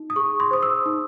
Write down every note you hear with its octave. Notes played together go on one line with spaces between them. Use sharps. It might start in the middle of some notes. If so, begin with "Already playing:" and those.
Already playing: D#4
D#6
G#4 C#6
C6
C5 D#6
E6
D#4